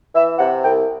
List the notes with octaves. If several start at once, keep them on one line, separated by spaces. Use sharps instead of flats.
E3 E5
C3 F#5
C2 G5